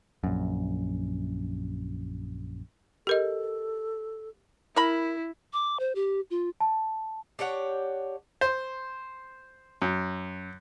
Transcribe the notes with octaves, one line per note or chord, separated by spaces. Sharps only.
A#1 F#2
G4 A4 A#4 D#5
E4 A#4 B5
D6
C5
G4
F4
A5
D4 G4 C#5 F#5
C5
F#2